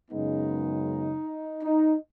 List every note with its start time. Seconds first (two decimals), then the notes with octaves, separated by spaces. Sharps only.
0.11 F#2 C#3 G#3 B3 D#4
1.62 D#4